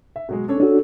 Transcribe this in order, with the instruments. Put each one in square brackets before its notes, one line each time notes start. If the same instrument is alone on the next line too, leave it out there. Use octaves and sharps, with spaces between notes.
[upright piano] E5
B2 F#3 G#3
[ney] C#4 [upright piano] D4 A4 C#5
[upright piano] C#4 [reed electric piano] D4 F#4 [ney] A4